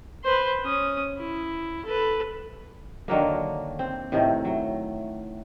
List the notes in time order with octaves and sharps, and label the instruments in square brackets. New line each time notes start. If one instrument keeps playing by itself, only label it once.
[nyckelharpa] B4 C5
C#4 D#6
E4
A4 B4
[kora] D3 D#3 F#3 A#3
C4
A2 C3 D#3 A3
F#3